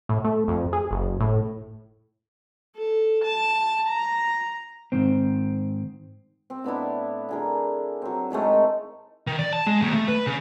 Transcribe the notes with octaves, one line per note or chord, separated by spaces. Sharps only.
A2
A3
F2
G#4
F#1
A2
A4
A5
A#5
G#2 D#3 C4
C4
A2 B3 D4 E4
D3 G#4 A#4
F#3 C4
A2 D#3 G#3 A3
D#3
D5
A5
G#3
D#2
A3
B4
C#3